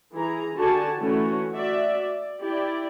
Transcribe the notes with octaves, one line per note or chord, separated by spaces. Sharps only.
E3 G#4 A#5
D3 F#4 G4 A4 G#5 A5
E3 A3 C#4 F#4
F#4 D5 E5
D5
E4 G4 D5